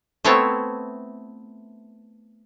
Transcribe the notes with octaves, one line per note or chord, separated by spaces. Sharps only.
A3 B3 C4 E4 C#5 A5